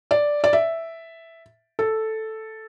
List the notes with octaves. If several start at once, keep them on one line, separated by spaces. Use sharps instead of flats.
D5
D5
E5
A4